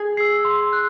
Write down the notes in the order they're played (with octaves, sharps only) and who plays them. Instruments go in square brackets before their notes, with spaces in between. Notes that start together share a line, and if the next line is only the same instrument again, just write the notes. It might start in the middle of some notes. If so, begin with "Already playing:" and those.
Already playing: [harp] G#4 G#5
[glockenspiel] E6 C7
C6
F#6